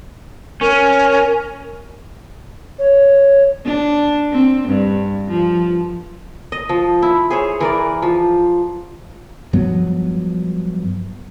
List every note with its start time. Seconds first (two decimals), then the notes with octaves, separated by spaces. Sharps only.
0.61 C#4 A#4
2.79 C#5
3.66 D4
4.32 C4
4.68 G2
5.29 F3
6.52 D#5
6.69 F3
7.02 E4
7.30 G#4 C5 C#5
7.61 E3 A#4 D5
8.02 F3
9.53 G2 F3 F#3 B3